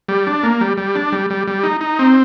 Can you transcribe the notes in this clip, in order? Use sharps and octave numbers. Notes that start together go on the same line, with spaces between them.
G3
D4
A#3
G3
G3
D4
G3
G3
G3
D#4
D#4
C4